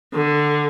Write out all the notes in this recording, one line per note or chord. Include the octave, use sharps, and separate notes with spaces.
D3